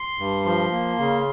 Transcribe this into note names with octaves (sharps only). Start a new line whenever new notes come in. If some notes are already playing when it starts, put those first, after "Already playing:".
Already playing: C6
G2
F3 C6
A#3
C#3